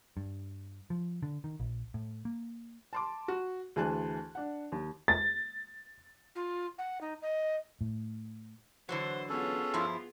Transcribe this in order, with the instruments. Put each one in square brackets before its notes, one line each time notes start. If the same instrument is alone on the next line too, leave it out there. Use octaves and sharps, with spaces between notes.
[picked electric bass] G2
F3
D3
D#3
A#1
A2
A#3
[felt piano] A5 C6 D6
F#4
D2 E3 G#4 G#5 A5 F#6
D4 F#5
D#2
[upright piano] A6
[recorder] F4
F#5
D#4
D#5
[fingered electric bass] A2
[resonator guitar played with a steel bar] D3 E3 F#3 [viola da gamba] C5
[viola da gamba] B3 F4 G#4 [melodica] C#4 A4
[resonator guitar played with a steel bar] G2 F3 E4